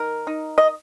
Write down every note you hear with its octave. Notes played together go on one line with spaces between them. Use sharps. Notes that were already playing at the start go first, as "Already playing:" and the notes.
Already playing: D#3 A#4
D#4
D#5